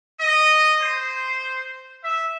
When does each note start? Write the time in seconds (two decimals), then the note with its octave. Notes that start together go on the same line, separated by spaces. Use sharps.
0.20 D#5
0.82 C5
2.04 E5